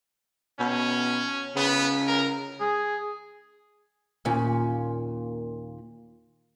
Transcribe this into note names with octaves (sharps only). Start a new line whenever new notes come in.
B2 C#4
C#3 B3
A#4
G#4
D#2 A#2 C#4